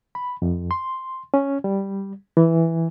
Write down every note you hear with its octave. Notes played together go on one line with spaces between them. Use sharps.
B5
F2
C6
C#4
G3
E3